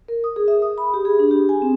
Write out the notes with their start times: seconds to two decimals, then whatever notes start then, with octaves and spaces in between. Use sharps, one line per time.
0.08 A#4
0.24 D#6
0.36 G#4
0.48 E5
0.62 D#6
0.78 B5
0.94 G4
1.05 G#4
1.19 D4
1.31 G4
1.49 G#5
1.62 C4